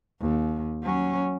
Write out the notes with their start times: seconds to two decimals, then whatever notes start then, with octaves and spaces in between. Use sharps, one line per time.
0.20 D#2
0.83 F#3 C#4